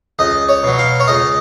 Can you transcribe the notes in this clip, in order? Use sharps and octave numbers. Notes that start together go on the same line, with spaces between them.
C#2 D#5
C#5
B2 F#3
F5
C#5
C#2 D#5